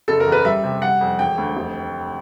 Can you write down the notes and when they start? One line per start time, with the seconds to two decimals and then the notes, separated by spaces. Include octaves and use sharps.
0.08 F#1 A4
0.20 A#4
0.26 E2
0.32 B4
0.45 G3 E5
0.64 C3
0.82 G3 F#5
1.01 F2
1.19 E1 G5
1.38 D2
1.57 F1